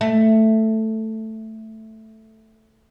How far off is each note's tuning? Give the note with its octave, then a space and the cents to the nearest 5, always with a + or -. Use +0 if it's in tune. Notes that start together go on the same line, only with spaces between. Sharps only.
A3 +5